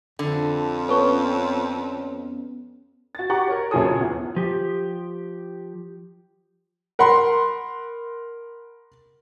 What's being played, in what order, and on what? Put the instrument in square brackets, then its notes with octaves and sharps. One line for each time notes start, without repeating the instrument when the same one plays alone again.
[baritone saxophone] F2 [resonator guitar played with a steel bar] D3
[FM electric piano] B3 C#4 [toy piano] A4 C#6
[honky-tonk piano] F#4 A6
G4 F#5 A#5 C#6
A#4 C#5
A#1 C#3 F#3 G#4 A4 D#6
F3 C#5
E2 A#2
[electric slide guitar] F3 G4
[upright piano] A#4 F#5 B5 C6